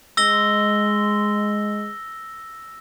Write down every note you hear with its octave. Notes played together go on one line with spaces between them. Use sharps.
G#3 E6 A#6 G7